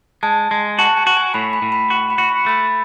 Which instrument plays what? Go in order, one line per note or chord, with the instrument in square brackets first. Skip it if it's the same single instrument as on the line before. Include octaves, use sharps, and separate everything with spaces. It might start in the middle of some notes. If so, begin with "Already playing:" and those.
[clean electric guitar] G#3 [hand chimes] A5
[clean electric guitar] G#3
[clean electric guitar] F#4 [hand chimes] A5
[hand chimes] G#5
[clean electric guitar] F#4
[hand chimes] G#5
[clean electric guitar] A2 [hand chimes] B5
[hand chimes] B5
[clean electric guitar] A2
[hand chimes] B5
[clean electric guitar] F#4 [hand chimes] B5
[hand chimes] B5
[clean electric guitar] F#4
[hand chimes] B5
[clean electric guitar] A3 [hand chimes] B5